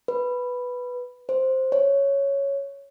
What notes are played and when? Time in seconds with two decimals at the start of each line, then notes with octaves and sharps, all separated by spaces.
0.08 B4
1.29 C5
1.72 C#5